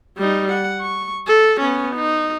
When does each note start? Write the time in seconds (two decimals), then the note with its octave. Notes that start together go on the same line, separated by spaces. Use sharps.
0.17 G3 D#4
0.51 F#5
0.81 C#6
1.27 A4
1.60 B3 C#4
1.95 D#4